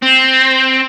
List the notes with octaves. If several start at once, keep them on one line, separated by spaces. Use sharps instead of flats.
C4